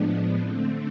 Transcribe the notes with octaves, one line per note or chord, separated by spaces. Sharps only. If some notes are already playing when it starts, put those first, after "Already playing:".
Already playing: A2 F3 G#3 B3 D4
D3 A3 C4